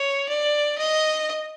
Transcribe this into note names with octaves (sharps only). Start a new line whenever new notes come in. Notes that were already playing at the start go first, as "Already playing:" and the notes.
Already playing: C#5
D5
D#5